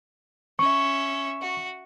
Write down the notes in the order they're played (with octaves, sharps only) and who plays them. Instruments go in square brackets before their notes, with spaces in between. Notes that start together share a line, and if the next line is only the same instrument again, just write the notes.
[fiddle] C#4 E5 [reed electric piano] C#6
[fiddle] F#4